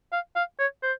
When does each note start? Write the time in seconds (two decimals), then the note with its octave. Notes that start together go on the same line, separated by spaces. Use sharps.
0.12 F5
0.36 F5
0.59 C#5
0.83 C5